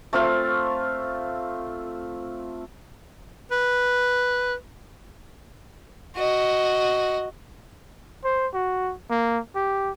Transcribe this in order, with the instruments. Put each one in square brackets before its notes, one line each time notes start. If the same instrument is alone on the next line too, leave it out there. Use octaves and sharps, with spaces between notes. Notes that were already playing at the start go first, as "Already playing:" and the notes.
[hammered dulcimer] A3 C4 F4 F5
[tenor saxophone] B4
[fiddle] F#4 D#5
[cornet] C5
F#4
A#3
G4